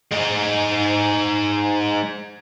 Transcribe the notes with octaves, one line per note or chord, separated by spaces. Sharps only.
G#3 D#4